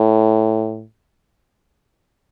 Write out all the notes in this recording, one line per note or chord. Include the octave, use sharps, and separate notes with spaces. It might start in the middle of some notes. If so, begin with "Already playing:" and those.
Already playing: A2